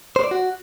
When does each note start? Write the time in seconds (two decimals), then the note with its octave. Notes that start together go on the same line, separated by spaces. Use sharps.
0.16 C5
0.24 D5
0.31 F#4